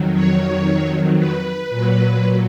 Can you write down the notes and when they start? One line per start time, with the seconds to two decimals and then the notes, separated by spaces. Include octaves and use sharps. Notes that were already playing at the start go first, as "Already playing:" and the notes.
Already playing: F2 D#3 F#3
0.14 C#5
1.18 B4
1.70 A#2 F#3